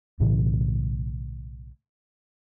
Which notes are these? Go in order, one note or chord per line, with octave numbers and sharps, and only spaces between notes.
B1 A2 C#3 E3